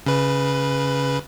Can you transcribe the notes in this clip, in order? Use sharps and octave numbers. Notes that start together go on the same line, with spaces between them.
C#3 B4